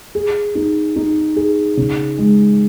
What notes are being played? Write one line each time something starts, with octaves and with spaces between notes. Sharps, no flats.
G#4
D#4
D#4
G#4
C#3
G#3